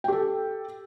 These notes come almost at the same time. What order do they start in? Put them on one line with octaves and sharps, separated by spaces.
G5 G4 A4